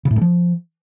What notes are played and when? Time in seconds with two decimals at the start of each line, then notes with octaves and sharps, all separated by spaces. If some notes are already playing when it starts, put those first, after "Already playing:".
0.05 C#3
0.11 A2
0.16 G2
0.21 F3